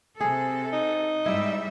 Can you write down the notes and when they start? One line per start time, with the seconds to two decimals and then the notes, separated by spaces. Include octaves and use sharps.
0.20 C3 G#4 A4
0.73 D#4
1.26 G#2 G3 E4 E5